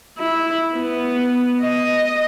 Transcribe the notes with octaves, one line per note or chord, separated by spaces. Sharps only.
E4
B3
D#5